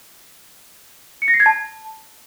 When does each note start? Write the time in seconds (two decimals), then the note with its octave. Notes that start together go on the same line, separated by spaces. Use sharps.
1.22 C#7
1.28 A#6
1.34 C7
1.40 G#6
1.46 A5